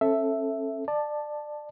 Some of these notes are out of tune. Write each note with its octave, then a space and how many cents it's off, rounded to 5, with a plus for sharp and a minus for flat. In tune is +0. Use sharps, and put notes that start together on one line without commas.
C#4 -40 A4 +0 E5 +0
D5 +25 A5 +0